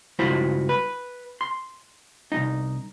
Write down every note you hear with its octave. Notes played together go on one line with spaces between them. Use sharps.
C#2 G2 E4 F#4 C5
B4
C6
C2 F#2 D#4